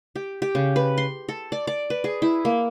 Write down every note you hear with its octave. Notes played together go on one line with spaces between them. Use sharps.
G4
G4
C#3
B4
C6
A4
D5
D5
B4
G#4
E4
A#3